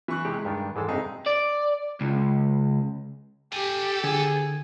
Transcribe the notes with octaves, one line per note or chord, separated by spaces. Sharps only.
E3 C#6 F#6
C3 G#3 G4
G2 D#3 D4
G#2 E3 G#3 G#4 A4
G2 C3 D#4 G#4
D5
C#2
G4 A4 G#5
D3 G#4